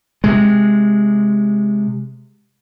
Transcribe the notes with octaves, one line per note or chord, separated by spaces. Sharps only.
C3 G#3